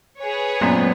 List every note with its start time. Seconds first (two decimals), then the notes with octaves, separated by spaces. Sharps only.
0.19 G#4 B4 C#5
0.61 F#2 A#2 G#3 B3 C4